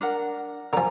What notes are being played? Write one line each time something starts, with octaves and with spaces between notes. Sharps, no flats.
D4 A#4 F#5
D3 F3 G#5 A#5